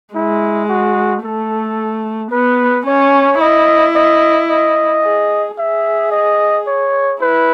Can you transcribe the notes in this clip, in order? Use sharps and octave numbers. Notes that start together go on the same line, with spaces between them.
G#3 E4
F#4
A3 A4
B3 B4
C#4 C#5
E4 D#5
D#5
D#5
G#4
G#4 E5
D#5
C#5
E4 B4